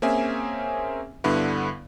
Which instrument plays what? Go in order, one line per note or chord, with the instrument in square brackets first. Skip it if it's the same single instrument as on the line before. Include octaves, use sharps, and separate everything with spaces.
[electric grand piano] A#3 C4 C#4 G#4 E5 G#5
G2 D3 B3 E4